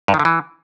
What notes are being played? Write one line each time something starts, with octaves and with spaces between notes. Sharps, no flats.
G2
D#3
D3
E3